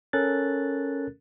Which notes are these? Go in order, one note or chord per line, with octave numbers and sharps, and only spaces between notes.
C#4 A4 A#4 F#6 A6